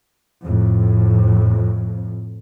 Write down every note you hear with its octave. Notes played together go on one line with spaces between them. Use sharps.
F2 A2